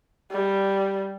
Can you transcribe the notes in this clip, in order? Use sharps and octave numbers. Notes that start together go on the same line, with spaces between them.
G3